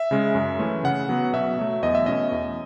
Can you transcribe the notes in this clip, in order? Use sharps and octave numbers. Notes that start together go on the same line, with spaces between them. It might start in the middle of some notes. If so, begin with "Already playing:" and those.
Already playing: E5
C#3 G#3 C#4
F#2
E3 A3 C#4
C#3 F#5
F#3 B3
B2 E5
F#3 A3
E2 D#5
E5
B2 A3 C#4 D#5
E2